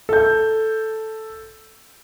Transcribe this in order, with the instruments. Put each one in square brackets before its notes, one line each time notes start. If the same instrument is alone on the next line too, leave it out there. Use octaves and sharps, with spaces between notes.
[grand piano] A4 G6